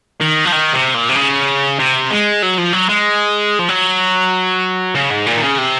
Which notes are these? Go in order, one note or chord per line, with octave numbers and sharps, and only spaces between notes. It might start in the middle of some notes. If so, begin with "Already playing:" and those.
D#3
F3
D#3
C3
A#2
C3
C#3
C3
G#3
F#3
F3
F#3
G#3
F3
F#3
C#3
G#2
A#2
D#3
C#3
C3